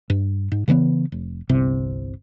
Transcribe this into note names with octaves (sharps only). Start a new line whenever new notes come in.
G2
G#2
C#3 E3 A#3 B3
F1
G1 C2 C3